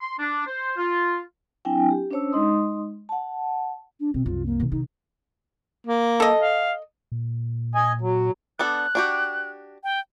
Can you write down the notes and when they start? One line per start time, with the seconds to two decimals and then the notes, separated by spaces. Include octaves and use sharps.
0.01 C6
0.19 D4
0.47 C5
0.77 F4
1.65 F#3 C4 D4 E4 G5 G#5
1.90 G4
2.11 C#4 D4 C5 C#5 A5 E6
2.32 G#3 D#4 D#5 C6 D#6
3.09 F#5 A5
4.00 D4
4.14 B2 C4
4.26 C2 F#2 F4
4.46 A#3
4.60 B2 D#3
4.71 C3 D#3 D#4
5.87 A#3
6.20 A4 D#5
6.41 F5
7.12 A#2
7.75 D#5 G#5
8.01 F#3
8.59 B3 D4 A4 F#6
8.95 D4 F#4 G4
9.84 G5